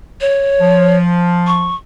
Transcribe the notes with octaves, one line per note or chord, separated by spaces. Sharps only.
C#5
F3
C#6